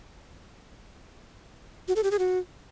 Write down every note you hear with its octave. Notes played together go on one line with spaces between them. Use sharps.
F#4
A4
G4
G#4
F#4